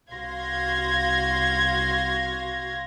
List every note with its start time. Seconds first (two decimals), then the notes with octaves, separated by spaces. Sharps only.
0.12 C2 F#4 F5 C6 G#6 A#6